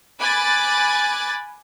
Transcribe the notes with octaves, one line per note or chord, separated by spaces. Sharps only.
G#5 B5 D6 F#6 G#6 A6